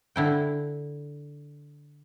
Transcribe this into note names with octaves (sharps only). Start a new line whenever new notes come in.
D3 E4 G5